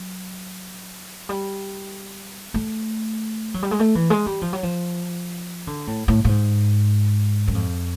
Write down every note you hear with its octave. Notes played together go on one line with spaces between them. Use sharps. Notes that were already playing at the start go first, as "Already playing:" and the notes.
Already playing: F#3
G3
A3
F#3
G3
G#3
A3
E3
G#3
G3
F3
F#3
F3
D3
A2
A2
A2
G#2
F#2
F2